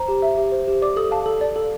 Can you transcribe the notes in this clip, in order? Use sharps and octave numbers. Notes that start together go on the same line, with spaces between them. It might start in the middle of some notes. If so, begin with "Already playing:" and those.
Already playing: C5 A#5
G4
E5
G4
C5
G4
D5 D6
A4 D#6
F5 A5
A4
D5
A4